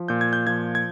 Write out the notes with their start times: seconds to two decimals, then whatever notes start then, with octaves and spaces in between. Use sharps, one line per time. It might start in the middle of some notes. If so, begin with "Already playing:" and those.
Already playing: F3
0.08 A#2 G6
0.21 G#6
0.33 G6
0.47 F3 G#6
0.75 G#6